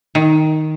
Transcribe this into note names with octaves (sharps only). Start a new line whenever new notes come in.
D#3